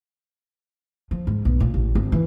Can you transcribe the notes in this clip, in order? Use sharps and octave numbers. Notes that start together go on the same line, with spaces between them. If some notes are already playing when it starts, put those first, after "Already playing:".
F3
G#2
B1
A#2
A1
G#1
E3